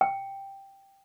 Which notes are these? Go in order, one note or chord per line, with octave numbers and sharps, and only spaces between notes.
G5